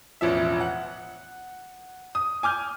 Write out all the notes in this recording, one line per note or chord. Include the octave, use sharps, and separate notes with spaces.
E1 A1 F3 E5
F#5
D#6
G#5 D6 F6 G6